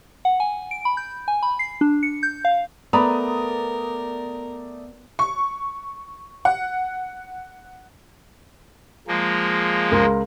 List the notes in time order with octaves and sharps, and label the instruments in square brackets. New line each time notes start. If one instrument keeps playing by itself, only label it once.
[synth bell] F#5
G#5
D7
B5
G6
G#5
B5
C7
D4
C#7
G6
F5
[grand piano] A3 D5 D#6 [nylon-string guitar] B3 [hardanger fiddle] A#4 [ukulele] A#5 B5
[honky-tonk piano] C#6
F#5
[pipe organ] F3 G#3 A#3
[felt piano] C#2 A#4 C6